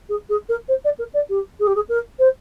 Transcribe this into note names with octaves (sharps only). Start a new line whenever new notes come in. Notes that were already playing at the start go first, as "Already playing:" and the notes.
G#4
G#4
A#4
C5
D5
A#4
D5
G4
G#4
G4
G#4
A#4
C5